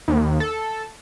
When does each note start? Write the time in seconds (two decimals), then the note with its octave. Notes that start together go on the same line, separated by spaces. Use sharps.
0.08 D#2
0.40 A4